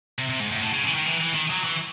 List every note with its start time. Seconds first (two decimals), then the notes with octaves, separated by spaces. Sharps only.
0.18 C3
0.29 C3
0.40 G#2
0.51 A2
0.62 A2
0.73 C#3
0.83 E3
0.95 D#3
1.06 E3
1.20 E3
1.35 D#3
1.50 F#3
1.64 E3